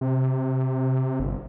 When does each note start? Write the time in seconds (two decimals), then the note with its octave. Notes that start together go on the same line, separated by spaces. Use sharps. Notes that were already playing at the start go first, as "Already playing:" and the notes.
0.01 C3
1.20 G1